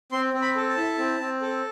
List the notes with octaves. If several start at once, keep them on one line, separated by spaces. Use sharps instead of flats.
C4 C6
C4
B5
A4
A5
E4
C4
C4
A4